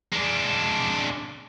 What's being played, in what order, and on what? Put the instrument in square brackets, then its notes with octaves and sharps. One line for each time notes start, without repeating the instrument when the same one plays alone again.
[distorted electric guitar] G#3 D4